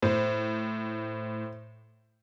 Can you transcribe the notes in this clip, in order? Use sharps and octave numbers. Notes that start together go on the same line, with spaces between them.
A2 C5